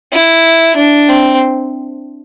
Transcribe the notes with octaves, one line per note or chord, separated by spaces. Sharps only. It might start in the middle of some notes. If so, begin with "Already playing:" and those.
E4
D4
C4